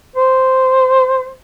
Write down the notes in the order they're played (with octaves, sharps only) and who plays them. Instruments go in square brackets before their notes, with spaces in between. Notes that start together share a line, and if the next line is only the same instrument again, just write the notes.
[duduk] C5